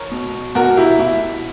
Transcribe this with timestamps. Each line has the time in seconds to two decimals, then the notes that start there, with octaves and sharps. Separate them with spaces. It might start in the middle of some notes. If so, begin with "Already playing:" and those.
Already playing: A#4 C#5
0.12 B2
0.55 B2 F#4 A#4
0.77 E4 G4
0.99 B2 E4